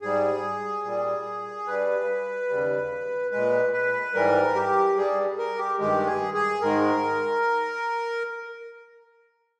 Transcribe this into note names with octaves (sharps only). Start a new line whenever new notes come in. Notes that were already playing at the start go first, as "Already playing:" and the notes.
G#2 G3 G#4
A#2 G3
G2 G3 B4
D#2 C#3 G3
A#2 G#3 B4
B4
G#2 E3 G3 A#4
G4
G2 G3 G#4
A#4
G4
G2 D#3 G#3 G4
G#4
G#4
G#2 D#3 G#3 A#4